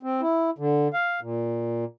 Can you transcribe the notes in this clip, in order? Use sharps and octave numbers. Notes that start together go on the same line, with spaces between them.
C4
E4
D3
F5
A#2